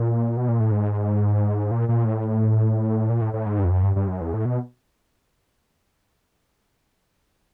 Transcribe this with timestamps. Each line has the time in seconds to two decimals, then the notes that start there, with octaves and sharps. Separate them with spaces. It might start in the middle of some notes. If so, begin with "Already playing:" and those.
Already playing: A#2
0.37 B2
0.49 A#2
0.60 A2
0.71 G#2
1.71 A#2
1.89 A#2
2.05 A2
3.09 A#2
3.21 A2
3.33 A2
3.46 G#2
3.59 G2
3.65 F2
3.71 F#2
3.83 G2
3.96 G2
4.08 F#2
4.21 E2
4.34 A2
4.45 B2